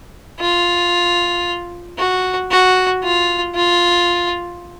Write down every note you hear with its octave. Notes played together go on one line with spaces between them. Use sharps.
F4
F#4
F#4
F4
F4